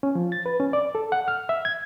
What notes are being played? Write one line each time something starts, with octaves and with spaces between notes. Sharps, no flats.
C#4
F3
A6
B4
C#4
D5
A4
F#5
F6
E5
G#6